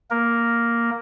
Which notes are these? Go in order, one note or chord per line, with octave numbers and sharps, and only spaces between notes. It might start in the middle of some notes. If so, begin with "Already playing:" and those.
A#3 A#4